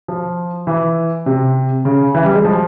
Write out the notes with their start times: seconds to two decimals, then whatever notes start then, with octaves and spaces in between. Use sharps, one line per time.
0.08 F3
0.67 E3
1.26 C3
1.85 C#3
2.15 E3
2.25 G3
2.34 G#3
2.45 F3